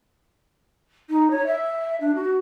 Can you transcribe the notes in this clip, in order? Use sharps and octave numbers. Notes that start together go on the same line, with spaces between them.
D#4
C#5
E5
D4
F#4